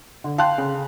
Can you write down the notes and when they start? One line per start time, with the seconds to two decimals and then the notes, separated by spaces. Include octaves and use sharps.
0.24 D3
0.38 F5 G5 A5 C6 F#6
0.58 C#3